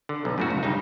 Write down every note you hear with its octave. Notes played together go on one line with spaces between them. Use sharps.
D3
B1
F#2 A2 F#4
C#2
G2 C#3 D#4